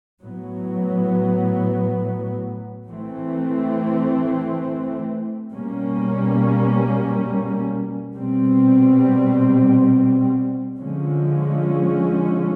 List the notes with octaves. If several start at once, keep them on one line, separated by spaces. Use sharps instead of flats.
A2 F#3 B3
E3 A3 C4
B2 G3 A#3 C#4
B2 G3 C4
D3 F3 G#3 C#4